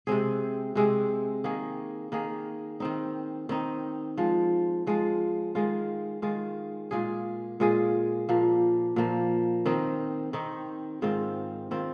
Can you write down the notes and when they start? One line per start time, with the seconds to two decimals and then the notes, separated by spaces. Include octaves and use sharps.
0.07 C3 G#3 C4 G#4
0.75 C3 G#3 C4 G#4
1.44 D#3 A#3 G#4
2.12 D#3 A#3 G#4
2.80 D#3 C4 D#4
3.49 D#3 C4 D#4
4.18 F3 G#3 F4
4.87 F3 G#3 F4
5.55 D#3 G#3 F4
6.22 D#3 G#3 F4
6.91 A#2 G#3 F4 G#4
7.60 A#2 G#3 F4 G#4
8.29 A#2 F3 A#3
8.96 A#2 F3 A#3
9.66 D#3 C4 D#4
10.33 D#3 C4 D#4
11.02 G#2 D#3 C4 F4
11.71 D#3 C4 F4